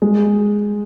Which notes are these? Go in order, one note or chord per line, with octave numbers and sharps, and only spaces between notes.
G#3